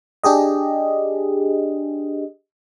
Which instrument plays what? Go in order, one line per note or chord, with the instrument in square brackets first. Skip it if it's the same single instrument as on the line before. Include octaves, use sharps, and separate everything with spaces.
[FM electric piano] D4 G4 G#4 D#5